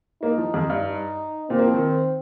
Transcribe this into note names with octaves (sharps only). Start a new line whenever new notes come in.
A#3 D#4
F3
F2
G2
D#4
A#2 C4
A#3
F3
D#3